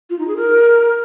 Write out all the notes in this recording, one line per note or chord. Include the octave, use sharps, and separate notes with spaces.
F4
D#4
G#4
A#4